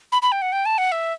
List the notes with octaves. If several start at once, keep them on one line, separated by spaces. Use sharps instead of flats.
B5
B5
G5
F#5
G5
A5
F#5
E5